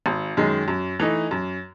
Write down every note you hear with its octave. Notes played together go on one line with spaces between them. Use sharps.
G#1
F#2 D#3 G#3
F#2
E3 A3 D#4
F#2